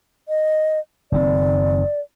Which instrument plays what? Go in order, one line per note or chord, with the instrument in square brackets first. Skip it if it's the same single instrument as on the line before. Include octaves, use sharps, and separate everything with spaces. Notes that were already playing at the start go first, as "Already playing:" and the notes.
[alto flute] D#5
[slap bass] F#1 D#3 C4 [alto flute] D5